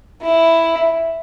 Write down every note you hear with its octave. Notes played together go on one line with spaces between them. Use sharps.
E4